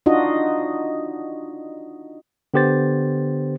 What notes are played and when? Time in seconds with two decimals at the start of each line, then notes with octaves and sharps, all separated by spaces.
0.06 D4 D#4 F4 F#4 D#5
2.54 D3 B3 G4 C5 A6